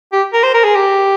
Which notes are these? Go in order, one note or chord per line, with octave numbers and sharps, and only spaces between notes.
G4
A#4
C5
A#4
G#4
G4